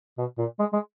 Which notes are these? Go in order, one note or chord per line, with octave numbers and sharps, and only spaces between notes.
B2
A#2
G#3
G#3